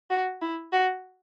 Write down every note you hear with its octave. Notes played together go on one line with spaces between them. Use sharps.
F#4
E4
F#4